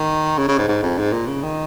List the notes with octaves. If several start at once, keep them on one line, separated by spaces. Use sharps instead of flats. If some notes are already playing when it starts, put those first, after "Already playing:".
Already playing: D#3
C#3
C#3
G#2
G#2
F2
G#2
A#2
C#3
D#3